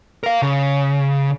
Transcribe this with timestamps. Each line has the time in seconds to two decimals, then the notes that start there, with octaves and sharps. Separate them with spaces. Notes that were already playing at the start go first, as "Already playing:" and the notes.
0.23 A#4 F5
0.42 C#3